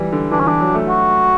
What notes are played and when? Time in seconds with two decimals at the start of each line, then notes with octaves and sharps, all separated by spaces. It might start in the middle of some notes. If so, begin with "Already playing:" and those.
Already playing: E3 G3
0.13 D3
0.31 E3 D4
0.40 C#4
0.46 E3 D4
0.60 F#3
0.75 A3
0.89 F#4